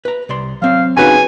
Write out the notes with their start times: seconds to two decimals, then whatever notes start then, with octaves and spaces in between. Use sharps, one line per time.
0.05 B4 A#5
0.29 C2 D5 C6
0.62 F#3 C4 F5
0.97 C#3 C4 D#4 F#4 B4 C#5 G#5